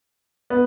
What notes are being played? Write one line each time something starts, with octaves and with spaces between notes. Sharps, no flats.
B3